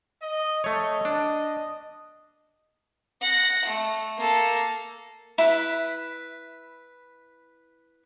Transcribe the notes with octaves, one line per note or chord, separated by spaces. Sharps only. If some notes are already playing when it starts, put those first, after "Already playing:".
D#5
A3 C#5 D#5
D4
F#5 A#6
A3
A#3 A4
E4 B4